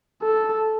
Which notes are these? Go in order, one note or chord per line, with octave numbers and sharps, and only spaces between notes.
A4